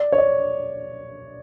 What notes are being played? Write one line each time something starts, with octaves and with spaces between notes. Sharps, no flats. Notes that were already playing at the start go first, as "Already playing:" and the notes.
Already playing: D5
C#5
D5